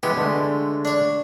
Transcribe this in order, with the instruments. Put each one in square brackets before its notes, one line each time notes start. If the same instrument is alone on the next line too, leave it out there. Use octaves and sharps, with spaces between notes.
[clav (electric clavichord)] E3 G#3 B3 [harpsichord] G4
[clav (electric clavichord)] D3 G#3 A3
[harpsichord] D4 C#5